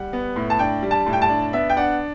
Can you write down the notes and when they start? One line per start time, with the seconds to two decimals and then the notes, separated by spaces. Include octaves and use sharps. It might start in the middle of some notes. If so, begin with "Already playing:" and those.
Already playing: G3 F#5
0.13 B3
0.36 A2
0.50 A5
0.59 D4 G5
0.83 G3
0.91 A5
1.06 A2
1.13 G5
1.22 A5
1.29 D4
1.53 B3 E5
1.70 G5
1.77 D4 F#5